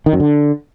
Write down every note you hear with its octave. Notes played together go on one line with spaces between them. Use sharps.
D#3
F#2
D3